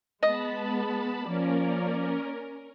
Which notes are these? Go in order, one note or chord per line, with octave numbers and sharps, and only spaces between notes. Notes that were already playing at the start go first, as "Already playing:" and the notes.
G#3 B3 D#5 A5 B5
F3 A#3 C#4 A#4 D5